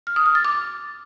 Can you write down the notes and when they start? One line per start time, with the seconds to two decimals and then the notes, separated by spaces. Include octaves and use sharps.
0.07 F6
0.16 D#6
0.26 F6
0.35 A6
0.45 D6